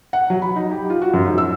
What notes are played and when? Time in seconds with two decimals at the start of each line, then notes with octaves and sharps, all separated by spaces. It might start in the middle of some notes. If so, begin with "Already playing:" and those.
0.13 F#5
0.30 F#3
0.42 B5
0.56 D#4
0.71 G4
0.90 F4
1.02 F#4
1.14 F#2
1.26 G#2
1.38 E6